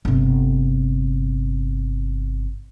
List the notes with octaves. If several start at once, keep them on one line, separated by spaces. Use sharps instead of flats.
G1 C3